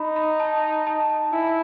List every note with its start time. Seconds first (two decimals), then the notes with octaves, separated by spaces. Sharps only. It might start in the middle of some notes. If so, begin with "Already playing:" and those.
Already playing: D#4 B5
0.16 B5
0.40 A5
0.87 A5
1.10 A5
1.32 E4 G#5